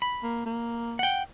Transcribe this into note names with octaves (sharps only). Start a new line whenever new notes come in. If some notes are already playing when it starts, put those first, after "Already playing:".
B5
A#3
A#3
F#5 G5